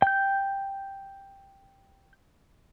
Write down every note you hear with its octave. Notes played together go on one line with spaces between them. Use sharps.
G5 G6